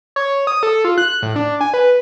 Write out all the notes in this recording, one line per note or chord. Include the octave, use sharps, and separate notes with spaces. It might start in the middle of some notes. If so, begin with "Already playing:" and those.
C#5
D#6
A4
F4
F#6
A2
D4
G#5
B4